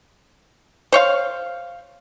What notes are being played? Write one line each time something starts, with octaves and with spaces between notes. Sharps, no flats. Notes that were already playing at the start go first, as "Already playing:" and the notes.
C5 C#5 F5